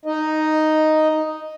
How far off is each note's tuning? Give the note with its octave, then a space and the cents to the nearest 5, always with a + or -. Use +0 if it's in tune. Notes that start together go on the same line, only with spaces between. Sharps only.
D#4 +0 D#5 +0